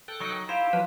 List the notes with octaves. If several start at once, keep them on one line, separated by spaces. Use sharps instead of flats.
A4 G5 F#6
F#3 D#4
E4 G4 C5 F5
F3 F#3 B4